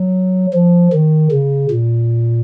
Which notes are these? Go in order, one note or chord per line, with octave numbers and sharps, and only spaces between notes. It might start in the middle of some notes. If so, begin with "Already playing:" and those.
Already playing: F#3
F3
D#3
C#3
A#2